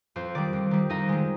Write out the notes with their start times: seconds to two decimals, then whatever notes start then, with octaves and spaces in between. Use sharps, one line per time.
0.16 F2 C5
0.35 D#3 G3 D5
0.53 F2
0.71 D#3 G3
0.90 F2 D#4 D#5
1.09 D#3 G#3